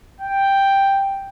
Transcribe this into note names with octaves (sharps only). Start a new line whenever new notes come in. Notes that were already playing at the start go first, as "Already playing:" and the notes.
G5